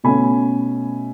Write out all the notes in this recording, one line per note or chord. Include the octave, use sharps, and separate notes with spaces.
B2 A3 C#4 G#5 B5